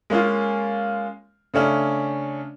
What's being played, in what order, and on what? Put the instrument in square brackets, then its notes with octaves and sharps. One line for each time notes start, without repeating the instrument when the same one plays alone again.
[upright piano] G#3 A#3 C#4 F4
C#3 A3 C#4 D4